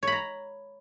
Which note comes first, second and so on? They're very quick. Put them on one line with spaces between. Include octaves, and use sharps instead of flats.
C#5 B5 A#5